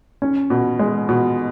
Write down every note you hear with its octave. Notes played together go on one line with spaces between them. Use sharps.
C#4
B2
G#3
B2